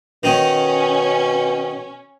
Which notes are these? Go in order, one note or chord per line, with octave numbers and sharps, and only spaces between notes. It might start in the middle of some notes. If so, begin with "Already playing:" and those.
B2 D#3 C#4 D#4